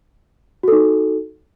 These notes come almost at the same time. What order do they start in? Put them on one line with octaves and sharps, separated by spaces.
F#4 A4 D#4